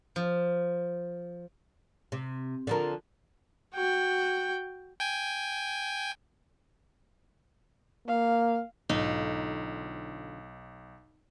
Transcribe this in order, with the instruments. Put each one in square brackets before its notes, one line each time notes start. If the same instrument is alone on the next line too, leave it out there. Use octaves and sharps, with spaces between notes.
[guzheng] F3
[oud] C3
D3 F3 A#4
[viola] F#4 G5
[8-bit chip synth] G5 G#5
[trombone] A#3 [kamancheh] F5
[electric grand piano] B1 [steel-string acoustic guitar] G#2 D3 F4 [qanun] D#4